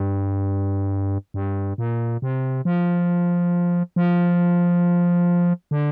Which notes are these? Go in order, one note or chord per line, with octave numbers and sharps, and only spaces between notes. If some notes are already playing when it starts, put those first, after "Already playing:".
Already playing: G2
G2
A#2
C3
F3
F3
D3